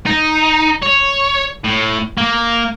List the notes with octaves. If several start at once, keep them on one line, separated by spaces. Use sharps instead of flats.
D#4
C#5
A2
A#3